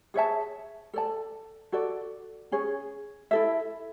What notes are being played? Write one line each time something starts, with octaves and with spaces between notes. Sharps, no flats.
G#4 C#5 E5 A5
A4 D5 A5
F#4 A4 D5
C#4 G#4 C#5
E4 A4 E5